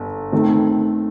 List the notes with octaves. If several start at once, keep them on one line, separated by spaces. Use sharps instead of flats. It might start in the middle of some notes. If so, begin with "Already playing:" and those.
Already playing: G1
D#3 A3 C4